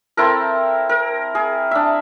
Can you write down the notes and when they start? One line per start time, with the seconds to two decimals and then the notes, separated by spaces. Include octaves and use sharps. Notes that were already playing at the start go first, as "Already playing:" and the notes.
0.17 C4 E4 A4 A#4
0.89 A#4
1.35 G#4
1.71 D4 E5